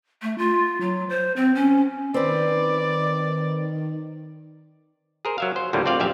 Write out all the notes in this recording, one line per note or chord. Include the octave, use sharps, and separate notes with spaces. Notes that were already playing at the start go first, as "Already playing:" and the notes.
A3
F4
F#3
C5
C4
C#4
D#3 C4 B4 D5
G#4 A#4 C5
F#3 E5 F5
C5
D2 A2 F3 G3 A#3
G3 C4 F4 D5 F5
A#1 F#2 G4 E5 F5